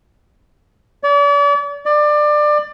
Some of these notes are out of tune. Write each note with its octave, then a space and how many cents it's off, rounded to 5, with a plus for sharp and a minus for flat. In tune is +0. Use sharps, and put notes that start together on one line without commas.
D5 -40
D5 +25